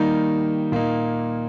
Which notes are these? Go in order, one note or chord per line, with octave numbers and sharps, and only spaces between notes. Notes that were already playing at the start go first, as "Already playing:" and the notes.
Already playing: D#3 G3 A#3 D#4
A#2 A#3 D#4